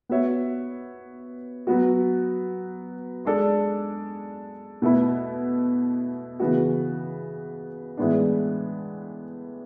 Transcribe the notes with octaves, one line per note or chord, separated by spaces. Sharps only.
B3 F#4 C#5 E5
F#3 B3 F#4
G#3 D4 A4 D5
B2 A3 E4 B4
C#3 E3 B3 F#4
A2 E3 G#3 B3 D4